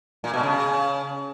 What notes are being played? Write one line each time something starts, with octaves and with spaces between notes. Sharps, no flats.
A#2
B2
C#3